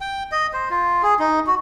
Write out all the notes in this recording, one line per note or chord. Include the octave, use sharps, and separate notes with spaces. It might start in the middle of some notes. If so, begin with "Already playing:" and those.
G5
D#5
C5
F4
G#4
D#4
F#4